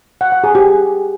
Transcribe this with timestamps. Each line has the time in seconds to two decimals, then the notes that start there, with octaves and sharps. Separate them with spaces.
0.21 F#5
0.32 F#5
0.44 G#4
0.55 G4